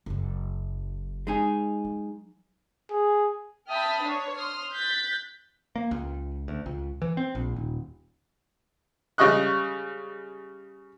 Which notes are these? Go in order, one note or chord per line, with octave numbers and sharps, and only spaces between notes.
F#1 F#2
G#3 D#4 G#4
F#3
G#4
E5 G5 A5 B5 D#6 F6
D4 C#5
C6 D#6 F6
F#6 G6 A6 B6
A#3
C#2
D2
C#2
E3
C4
A#1
D#1
C#3 G3 D#5 C#6 F#6